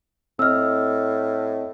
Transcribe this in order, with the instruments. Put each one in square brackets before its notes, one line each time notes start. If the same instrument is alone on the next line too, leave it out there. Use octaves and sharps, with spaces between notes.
[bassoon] A2 [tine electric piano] C4 D#5 [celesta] E6 F6